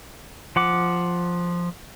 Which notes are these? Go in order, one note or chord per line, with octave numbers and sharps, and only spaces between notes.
F3 F#5 D6